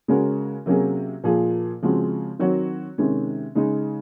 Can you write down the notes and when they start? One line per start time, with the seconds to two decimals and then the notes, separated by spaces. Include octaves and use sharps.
0.08 C#3 G#3 C#4 F#4 A#4
0.66 C3 F#3 A#3 C#4 G#4
1.24 A#2 F3 A#3 F4 G#4
1.82 C#3 F3 G#3 C4 F#4
2.39 D#3 F#3 C4 F#4 C#5
2.98 C3 D#3 G#3 C#4
3.55 C#3 G#3 D#4